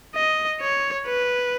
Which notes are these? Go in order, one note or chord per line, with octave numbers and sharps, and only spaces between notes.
D#5
C#5
B4